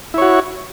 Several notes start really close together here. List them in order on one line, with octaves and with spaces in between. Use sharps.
E4 C#5 F#4